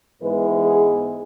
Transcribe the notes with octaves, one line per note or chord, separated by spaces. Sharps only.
G#2 E3 G#3 B3 B4
G#4